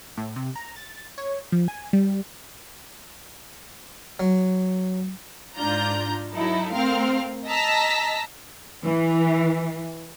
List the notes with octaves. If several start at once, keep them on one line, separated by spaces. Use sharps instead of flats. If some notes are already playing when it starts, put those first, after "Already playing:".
A2
C3
A#5
A6
C#5
F3
G#5
G3
F#3
G#2 D4 F4 A#5 G6
F#3 D#4 E4 A4
A3 C4 A#4 F5 F6
D#5 A5 A#5 E6 A#6 B6
E3